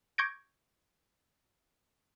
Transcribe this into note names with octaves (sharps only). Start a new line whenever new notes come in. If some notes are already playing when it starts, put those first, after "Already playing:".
C#6 D6 G6 G#6 A#6 D7